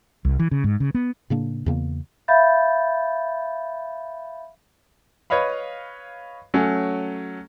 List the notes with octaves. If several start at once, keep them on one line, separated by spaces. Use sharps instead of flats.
C2
E3
C#3
G#2
C#3
B3
A2 C#3 A#3 D4
E2 C#3 A#3
E5 F5 B5 G6 A6
B4 C#5 D#5 F5 B5
F#3 A3 C#4